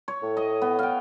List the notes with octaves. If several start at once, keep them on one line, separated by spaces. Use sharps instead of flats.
C#5
A2
D#5
B3
F5 G5